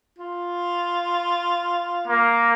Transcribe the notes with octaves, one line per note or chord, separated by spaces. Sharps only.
F4
A#3